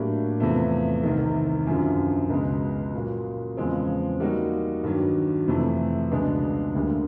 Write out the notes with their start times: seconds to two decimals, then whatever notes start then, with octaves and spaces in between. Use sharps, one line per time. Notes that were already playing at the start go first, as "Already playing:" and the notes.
Already playing: A2 F#3 A#3 D4 G4
0.40 E2 C3 F3 A3
1.03 C2 C3 D#3
1.67 F#2 D3 F3
2.30 C#2 B2 G#3
2.94 A#2 F#3 A#3
3.57 E2 C#3 F3 G#3 C4
4.20 G3 A#3 D#4 F#4
4.84 G2 D#3 F#3
5.48 F2 C3 E3 A3
6.11 C#2 B2 G#3 B3 D4
6.75 D2 D3 G3 A#3